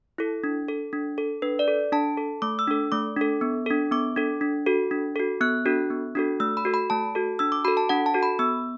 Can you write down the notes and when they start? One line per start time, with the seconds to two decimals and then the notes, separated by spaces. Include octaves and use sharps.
0.18 E4 A4
0.44 D4
0.68 A4
0.93 D4
1.18 A4
1.42 D4 B4
1.59 D5
1.68 A4
1.92 D4 A5
2.17 A4
2.42 A3 D6
2.59 E6
2.67 D4 A4
2.92 A3 D6
3.16 D4 A4
3.41 B3
3.66 D4 A4
3.91 B3 D6
4.16 D4 A4
4.41 D4
4.66 F#4 A4
4.91 D4
5.16 F#4 A4
5.41 B3 F#6
5.66 D4 F#4 A4
5.90 B3
6.15 D4 F#4 A4
6.40 A3 E6
6.57 B5
6.65 F#4 A4
6.74 B5
6.90 A3 A5
7.15 F#4 A4
7.39 D4 E6
7.52 D6
7.65 F#4 A4 B5
7.77 A5
7.89 D4 F#5
8.06 A5
8.14 F#4 A4
8.23 B5
8.39 B3 E6